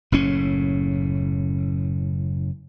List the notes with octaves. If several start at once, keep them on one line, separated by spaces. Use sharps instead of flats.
F#1 A2 C#4